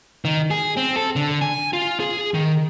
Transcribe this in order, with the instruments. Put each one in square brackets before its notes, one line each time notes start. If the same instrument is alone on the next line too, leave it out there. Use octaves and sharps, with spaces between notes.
[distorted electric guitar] D#3
G#4
C4
A4
D3
G#5
F4
G#4
D#3